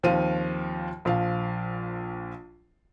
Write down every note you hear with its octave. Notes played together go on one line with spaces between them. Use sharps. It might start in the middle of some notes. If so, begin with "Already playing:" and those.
D#2 F3 C4 F5 D#7
A#1 F3 F5